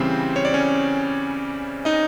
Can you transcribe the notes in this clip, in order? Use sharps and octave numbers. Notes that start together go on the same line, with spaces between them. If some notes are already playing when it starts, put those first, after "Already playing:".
Already playing: C#3 E3 G3 C4 C5
C#5
D5
C#4 C#5
D#4 D#5